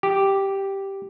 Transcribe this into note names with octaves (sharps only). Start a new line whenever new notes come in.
G4